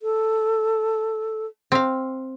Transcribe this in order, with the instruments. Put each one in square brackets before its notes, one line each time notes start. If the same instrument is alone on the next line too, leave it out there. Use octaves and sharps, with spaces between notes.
[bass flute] A4
[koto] C4 F5